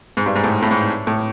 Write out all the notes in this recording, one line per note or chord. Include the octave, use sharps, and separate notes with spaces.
G#2
G2
G#2
A2
A2
G#2
A2